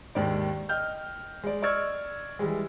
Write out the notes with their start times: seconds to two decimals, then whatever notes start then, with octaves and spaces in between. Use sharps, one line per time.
0.15 D#2 G#2 D#3 D5
0.69 D#5 G5 F6 G6
1.44 G#3 D5
1.62 D5 D#5 C#6 E6 F6 G#6
2.39 E3 G3 G#3